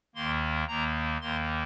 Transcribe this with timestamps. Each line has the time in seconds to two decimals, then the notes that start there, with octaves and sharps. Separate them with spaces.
0.15 D#2 D#3 A#3 C6
0.68 D#2 D#3 A#3 A#5
1.21 D#2 D#3 A#3 C6